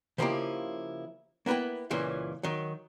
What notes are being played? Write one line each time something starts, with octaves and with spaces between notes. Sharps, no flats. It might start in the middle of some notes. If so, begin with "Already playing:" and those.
C#3 F3 A#3 D#4 E4 G4
A#3 B3 E4 B4 G5
C#2 A#2 E3 C#4
D#3 F#3